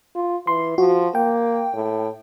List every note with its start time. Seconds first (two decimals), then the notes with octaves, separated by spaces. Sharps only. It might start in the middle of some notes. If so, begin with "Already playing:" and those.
0.15 F4
0.47 E3 C6
0.78 F3 F#4
1.15 A#3 G5
1.74 A2